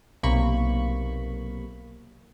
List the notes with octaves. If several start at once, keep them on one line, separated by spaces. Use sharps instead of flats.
B1 C3 A#3 B5 C#6